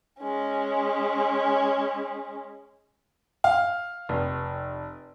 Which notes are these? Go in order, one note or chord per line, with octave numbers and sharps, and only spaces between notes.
G#3 C#4
F5
F1